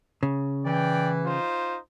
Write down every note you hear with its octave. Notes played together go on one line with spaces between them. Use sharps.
C#3
E3 D5 G5
D#4 F4 C5